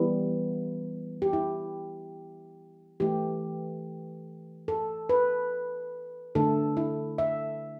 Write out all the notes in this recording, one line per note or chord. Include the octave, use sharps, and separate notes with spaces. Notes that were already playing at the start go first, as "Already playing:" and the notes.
Already playing: E3 G3 B3 E4
G4
E4
E3 A3 G4
A4
B4
D3 A3 A4
E4
E5